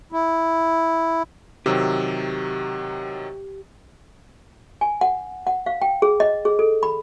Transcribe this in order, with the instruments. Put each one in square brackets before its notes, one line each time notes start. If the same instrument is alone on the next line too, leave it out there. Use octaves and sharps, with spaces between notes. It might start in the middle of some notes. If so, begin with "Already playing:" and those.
[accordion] E4
[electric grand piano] C3 D#3 F#3 [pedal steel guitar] G4 E6
[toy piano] G#5
F#5
F#5
F5
G5
G#4
D#5
G#4
A4
B5